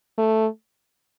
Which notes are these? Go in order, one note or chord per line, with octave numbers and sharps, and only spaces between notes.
A3